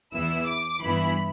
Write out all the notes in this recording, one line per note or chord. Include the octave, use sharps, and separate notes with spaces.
E2 E3 B3 E4 E6
D6
G2 E3 B3 E4 B5